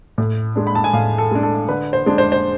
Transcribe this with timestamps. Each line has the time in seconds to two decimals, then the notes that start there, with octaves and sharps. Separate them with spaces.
0.18 A2
0.56 G#3 D4
0.67 B5
0.75 A5
0.84 G#5
0.93 A2 F5
1.18 A4
1.31 G#3 D4
1.43 A4
1.68 D3 B4
1.93 C5
2.06 G#3 D4
2.18 C5
2.32 C5